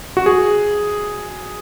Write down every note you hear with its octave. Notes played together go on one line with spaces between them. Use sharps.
F#4
G#4